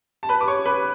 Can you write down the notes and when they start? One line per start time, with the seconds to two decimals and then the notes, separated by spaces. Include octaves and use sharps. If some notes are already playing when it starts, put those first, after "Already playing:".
0.23 A5
0.29 B4 B5
0.41 D6
0.48 C#5 C#6
0.66 B4 B5